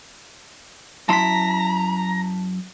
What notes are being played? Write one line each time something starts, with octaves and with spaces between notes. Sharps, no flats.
F#2 E4 A5 A#5 C6 B6